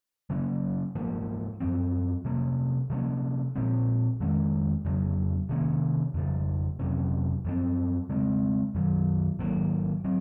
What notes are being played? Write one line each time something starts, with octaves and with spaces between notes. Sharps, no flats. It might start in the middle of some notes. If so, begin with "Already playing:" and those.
C#3 F#3 A#3 C#4
G#2 F3 A#3
F#2 F3 C4
C3 F3 A#3 C#4
C3 F3 A#3 C#4
A#2 F3 C4
F2 D#3 G#3 C#4
F2 C#3 F#3
C3 D#3 A#3 C#4
F2 C#3 F3
F2 C3 F#3 C#4
F#2 F3 C4
C#3 G#3 C4
F#2 D#3 F#3
G#2 D#3 F#3 A#3
F#3 C4